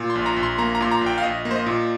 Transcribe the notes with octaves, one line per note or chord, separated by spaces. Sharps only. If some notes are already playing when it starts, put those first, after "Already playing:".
Already playing: A#2
C6
A#1
A#5
A#1
C6
A#3 A#5
A#5
A#2 C6
A#5
A#1
G5
F5
A#1 D#5
A#3
C5
D#5
A#2